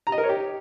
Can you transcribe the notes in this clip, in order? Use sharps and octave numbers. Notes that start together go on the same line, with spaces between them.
A#5
D#5
A#4
C#5
G4